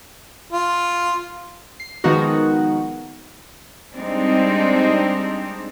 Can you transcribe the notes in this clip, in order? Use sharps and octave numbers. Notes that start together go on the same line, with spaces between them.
F4
C7
D#3 F3 G#3 B3 D#4 F#4
G3 G#3 C4 D4 D#4